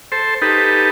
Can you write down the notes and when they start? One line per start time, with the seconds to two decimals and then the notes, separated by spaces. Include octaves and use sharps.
0.12 A4 C5
0.42 D#4 G4 A4 B4